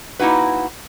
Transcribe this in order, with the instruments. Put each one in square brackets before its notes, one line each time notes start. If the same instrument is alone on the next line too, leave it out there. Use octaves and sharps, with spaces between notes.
[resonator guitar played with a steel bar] A#3 D#4 E4 F#4 B4